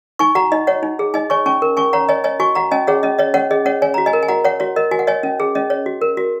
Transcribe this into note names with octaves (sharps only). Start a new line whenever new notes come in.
D#4 G#5 C#6
F#4 F#5 A#5
D#4 D#5
C#5 F#5
D#4
G#4
D#4 D#5 G#5
C#5 G#5 C#6
C#4 G#5 C#6
A#4
C#4 G#5 C#6
C#5 F#5 A#5
C#5 D#5 G#5
C#5 D#5 G#5
F#4 G#5 C#6
F#4 F#5 A#5
C#4 D#5 G#5
G#4 C#5 F#5
C#4 D#5
C#5 D#5
C#4 C#5 F#5
G#4 D#5
C#4 C#5 F#5
C#5 G#5
F#4 A#5
D#5 G#5
A#4
G#5
F#4 F#5 A#5
C#5 F#5
F#4 C#5
A#4 D#5
F#4 G#5
F#5
C#5 D#5 G#5
C#4
G#4
C#4 D#5
C#5
F#4
A#4
F#4